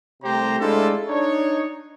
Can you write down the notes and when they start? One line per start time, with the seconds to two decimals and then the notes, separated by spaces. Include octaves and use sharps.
0.22 C2 C3 A3 G4 C5 A#5
0.59 G#3 A3 D4 E4 F4 A4
1.08 D4 D#4 C#5